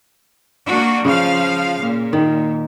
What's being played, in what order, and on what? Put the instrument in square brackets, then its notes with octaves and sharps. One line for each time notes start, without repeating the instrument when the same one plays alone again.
[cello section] A#3 D4 F#4
[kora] C#3 [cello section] F3 F5
[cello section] A#2
[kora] D#3